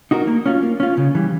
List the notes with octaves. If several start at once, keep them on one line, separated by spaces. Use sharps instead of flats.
D#4 F#4 A#4
A#3
C#4 F4
A#3
C#4 F4
C#3
E3 G3